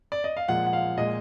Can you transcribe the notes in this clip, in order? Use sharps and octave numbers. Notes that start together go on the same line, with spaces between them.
D5
D#5
F5
A#2 F3 G#3 F#5
F#5
F5
A#2 G#3 D#5